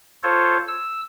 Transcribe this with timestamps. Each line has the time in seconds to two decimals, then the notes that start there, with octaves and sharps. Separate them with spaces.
0.23 F4 A4 C5 C#5
0.68 E6